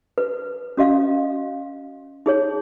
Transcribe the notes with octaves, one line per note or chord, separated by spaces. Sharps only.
B4
C#4 F#4 D#5 F5
D#4 G#4 C#5